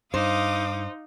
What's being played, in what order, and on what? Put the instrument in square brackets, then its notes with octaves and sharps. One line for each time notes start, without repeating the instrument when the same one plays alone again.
[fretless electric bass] G2 [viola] D#4 [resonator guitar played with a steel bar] C5 [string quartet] F5 D6 D#6